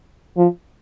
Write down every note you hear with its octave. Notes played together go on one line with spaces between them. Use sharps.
F3